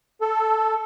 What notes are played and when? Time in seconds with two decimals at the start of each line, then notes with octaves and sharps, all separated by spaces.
0.21 A4